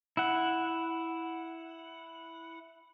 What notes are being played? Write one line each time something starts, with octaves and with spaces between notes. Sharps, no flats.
E4 F#5